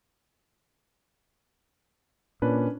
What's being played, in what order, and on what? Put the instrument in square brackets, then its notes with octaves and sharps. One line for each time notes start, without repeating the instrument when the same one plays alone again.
[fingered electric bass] A#2 [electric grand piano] C#4 D4 B4